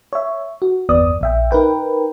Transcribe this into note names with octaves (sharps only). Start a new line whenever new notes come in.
C#5 E5
F#4
G1 E2 B3 D5 D#6
A#1 E5 G5
D#4 A#4 B4 G5